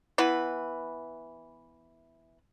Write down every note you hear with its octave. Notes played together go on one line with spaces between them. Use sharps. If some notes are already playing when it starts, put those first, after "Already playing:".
E3 B3 E4 B4